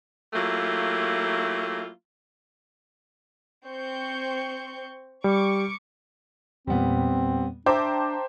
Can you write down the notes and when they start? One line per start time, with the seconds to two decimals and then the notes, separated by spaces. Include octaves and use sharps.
0.34 F#3 A3 A#3 E4 F4 G4
3.66 C4 C#6 G6
5.24 G3 C#6 D6 C#7
6.67 E2 A#2 G3 B3 C4
7.66 D4 C5 E5 G5 A5 A#5 D6